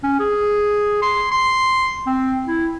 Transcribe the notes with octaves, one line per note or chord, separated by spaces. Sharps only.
C#4
G#4
C6
C6
C4
E4